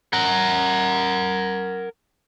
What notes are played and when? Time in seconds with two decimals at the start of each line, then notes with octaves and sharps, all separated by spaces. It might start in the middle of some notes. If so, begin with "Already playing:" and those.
0.13 A#4 F#5